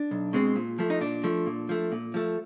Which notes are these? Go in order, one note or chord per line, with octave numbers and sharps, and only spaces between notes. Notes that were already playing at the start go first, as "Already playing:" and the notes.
Already playing: D4
B1
B2 G#3 C4
A#2
F3 A3
D#4
A#2 D4
F3 A3
A#2
F3 A3
A#2
F3 A3